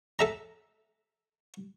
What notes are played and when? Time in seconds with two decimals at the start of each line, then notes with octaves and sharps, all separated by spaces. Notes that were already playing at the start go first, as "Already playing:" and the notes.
0.19 A4 E5 A#5